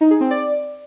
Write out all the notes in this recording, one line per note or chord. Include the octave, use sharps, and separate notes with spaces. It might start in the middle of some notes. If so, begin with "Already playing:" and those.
D#4
G#4
C4
D5